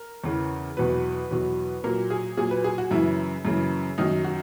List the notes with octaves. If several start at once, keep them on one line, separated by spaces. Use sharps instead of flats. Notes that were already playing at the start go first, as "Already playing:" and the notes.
Already playing: A#4
E2 C#3 E3
E2 B2 F#3 B4
E2 B2 F#3
A#2 F#3 A#4
G#4
A#2 F#3 G#4
B4
G#4
F#4
F#2 C#3 E3 E4
F#2 C#3 E3
F#2 D#3 F#3 D#4
F#4